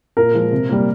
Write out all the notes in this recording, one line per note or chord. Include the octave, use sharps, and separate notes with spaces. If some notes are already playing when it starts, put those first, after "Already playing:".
A#2 A#4
F3 G#3
C3
G3 A#3